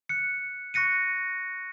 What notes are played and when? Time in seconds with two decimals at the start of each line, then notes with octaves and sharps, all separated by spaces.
0.09 F#6 C#7
0.74 C#6 F#6 A#6 C#7 D#7